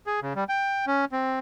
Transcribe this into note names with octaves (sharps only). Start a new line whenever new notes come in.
G#4
C#3
G3
G5
C#4
C4